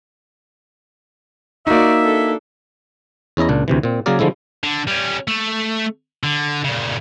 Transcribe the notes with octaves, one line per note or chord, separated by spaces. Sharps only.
A#3 D#4 F#4 D5 E5
D4 A4
E2 C#4 E4 D#5 A#5
C#2 A#2 D4
D2 C3 E3
A#2 C4
C#3 F#3 A#3 G#4 A#4 D5
D3 F3 G#3 A3 E4
D3
G3 C#4
A3
D3
A#2 C#3